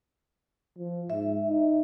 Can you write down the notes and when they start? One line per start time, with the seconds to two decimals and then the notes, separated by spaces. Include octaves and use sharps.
0.78 F3
1.10 G#2 E5
1.48 D#4